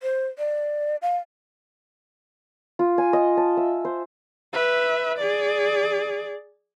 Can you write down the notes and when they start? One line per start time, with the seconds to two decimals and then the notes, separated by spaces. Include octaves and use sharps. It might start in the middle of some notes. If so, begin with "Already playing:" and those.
0.03 C5
0.38 D5
1.02 F5
2.79 F4
2.98 G#5
3.13 D#5
3.37 A5
3.57 E5
3.85 C5
4.53 B4 E5
5.18 G#4 D5